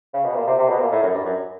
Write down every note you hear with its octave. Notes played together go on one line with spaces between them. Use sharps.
C#3
B2
A#2
C3
C3
B2
A#2
A2
F#2
G2
F#2